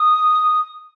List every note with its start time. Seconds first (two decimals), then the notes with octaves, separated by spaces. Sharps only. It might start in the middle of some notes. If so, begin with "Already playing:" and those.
Already playing: D#6